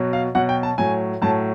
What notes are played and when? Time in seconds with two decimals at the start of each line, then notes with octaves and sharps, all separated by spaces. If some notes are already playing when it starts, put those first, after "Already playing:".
Already playing: B2 F#3
0.13 F5
0.35 B2 F#3 F#5
0.49 G5
0.63 A5
0.78 A2 F#3 G#5
1.22 A2 F#3 A5